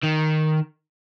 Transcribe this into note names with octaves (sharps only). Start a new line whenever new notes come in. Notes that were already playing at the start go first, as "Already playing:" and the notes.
D#3